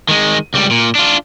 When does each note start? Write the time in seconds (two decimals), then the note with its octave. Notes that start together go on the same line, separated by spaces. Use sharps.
0.09 D#3 G#3
0.54 C#2 G3
0.71 A#2
0.95 D4 F4